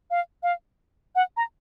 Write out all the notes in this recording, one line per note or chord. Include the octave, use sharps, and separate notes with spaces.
F5
F5
F#5
A#5